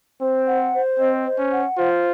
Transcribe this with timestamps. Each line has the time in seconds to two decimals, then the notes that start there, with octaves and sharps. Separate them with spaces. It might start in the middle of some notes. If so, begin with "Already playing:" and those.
0.21 C4 C5
0.47 F#5
0.73 C5
0.99 C4 D#5
1.25 C5
1.38 C#4
1.52 F#5
1.78 F4 C5